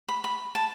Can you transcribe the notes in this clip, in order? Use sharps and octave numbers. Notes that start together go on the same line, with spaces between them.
B5
B5
A5